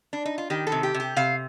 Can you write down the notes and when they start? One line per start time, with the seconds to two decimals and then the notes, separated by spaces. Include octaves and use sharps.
0.13 D4
0.25 D#4
0.38 F4
0.50 D#3 G4
0.67 A4
0.72 C3
0.83 G4
0.94 C3
1.00 G4
1.16 C3 F5